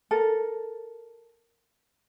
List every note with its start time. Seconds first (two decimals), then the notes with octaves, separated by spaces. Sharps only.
0.11 A4 A#4